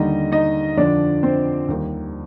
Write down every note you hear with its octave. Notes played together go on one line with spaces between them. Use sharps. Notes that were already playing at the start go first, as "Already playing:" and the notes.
Already playing: D#2 D3 G3 D#4 D#5
D#4 D#5
F2 D3 F3 D4 D5
C4 C5
D#2 D#3 G3